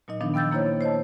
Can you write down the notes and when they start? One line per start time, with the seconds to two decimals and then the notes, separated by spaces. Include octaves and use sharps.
0.08 A#2 F#3 D#4 D#5
0.21 D#3 F3 B3 D4 D#4
0.34 B3 G5 E6 G6 A6
0.51 A#3 E4 C5 C#5
0.81 C5 C#5 D#5 A5